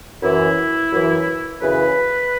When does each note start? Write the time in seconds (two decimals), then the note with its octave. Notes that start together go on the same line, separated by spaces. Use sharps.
0.22 F#2 E3 E4
0.92 F#2 E3
1.61 F#2 C#3 E3 B4